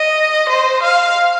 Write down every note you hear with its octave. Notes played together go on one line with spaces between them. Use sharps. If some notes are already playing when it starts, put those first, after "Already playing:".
Already playing: D#5
C5
F5